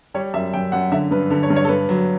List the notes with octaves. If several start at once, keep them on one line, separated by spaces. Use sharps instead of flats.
G3 C#5
F#2 E5
F#2 G5
F#2 F#5
D3 E5
G2 B4
D3 A4
C#5
G2
C#5
A4
G2 B4
F#3